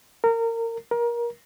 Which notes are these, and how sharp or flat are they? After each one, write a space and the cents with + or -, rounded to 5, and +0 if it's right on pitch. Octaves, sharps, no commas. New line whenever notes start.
A#4 -25
A#4 +25